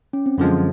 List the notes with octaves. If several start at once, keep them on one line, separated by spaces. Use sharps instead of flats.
C#4
C4
F#2 D3 F3 G#3